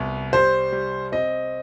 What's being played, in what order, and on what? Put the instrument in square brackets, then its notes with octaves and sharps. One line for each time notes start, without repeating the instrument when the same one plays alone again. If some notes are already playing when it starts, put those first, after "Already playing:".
Already playing: [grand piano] C2 B3
[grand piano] G3 [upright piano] C5
[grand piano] G3
[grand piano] C4 [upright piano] D#5